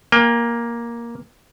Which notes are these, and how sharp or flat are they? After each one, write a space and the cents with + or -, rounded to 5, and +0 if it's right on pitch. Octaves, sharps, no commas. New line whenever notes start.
A#3 +10 G5 +35